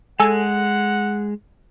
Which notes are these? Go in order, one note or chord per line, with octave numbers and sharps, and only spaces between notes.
G#3 A4 F#5 G#5